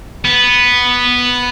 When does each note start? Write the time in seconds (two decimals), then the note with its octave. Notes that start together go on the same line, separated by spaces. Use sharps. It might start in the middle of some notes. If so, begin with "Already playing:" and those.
0.25 B3